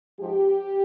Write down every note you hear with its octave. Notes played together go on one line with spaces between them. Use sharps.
G#2 F3 G#3 G4